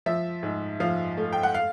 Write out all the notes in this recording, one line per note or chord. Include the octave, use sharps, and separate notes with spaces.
F3 E5
G#2
F3 F5
A3
G5
F#5
F5